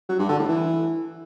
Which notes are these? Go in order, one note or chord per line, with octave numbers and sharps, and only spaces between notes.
F#3
G2
D3
A2
E3